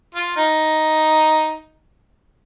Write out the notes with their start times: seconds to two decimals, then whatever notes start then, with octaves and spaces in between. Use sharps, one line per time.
0.14 F4
0.36 D#4